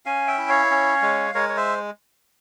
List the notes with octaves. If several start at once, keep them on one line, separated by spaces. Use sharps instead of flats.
C#4 F5 G#5
E5 G5
E4
C#5 F5
C#4
G#3
G#3 A#4 C#5
C#5
C5 E5